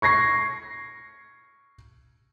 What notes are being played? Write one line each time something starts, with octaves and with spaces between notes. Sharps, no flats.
C#6 G#6 A#6 C7